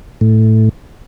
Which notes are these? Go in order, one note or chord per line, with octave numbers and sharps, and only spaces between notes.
A2